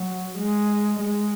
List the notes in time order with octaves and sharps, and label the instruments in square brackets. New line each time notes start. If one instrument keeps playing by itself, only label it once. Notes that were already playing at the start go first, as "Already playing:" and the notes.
Already playing: [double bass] F#3
G#3
G#3